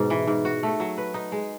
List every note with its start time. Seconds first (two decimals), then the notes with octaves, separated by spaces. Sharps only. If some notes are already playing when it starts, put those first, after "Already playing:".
Already playing: G#2 B2
0.10 E3
0.27 G#2
0.45 F#4
0.63 A3
0.80 F#3
0.98 B4
1.14 D#4
1.32 G#3